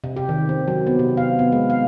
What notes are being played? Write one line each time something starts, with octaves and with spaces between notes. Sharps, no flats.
C3
G4
D#3
C4
F#3
B3
C3
F5
B3
G#3
F5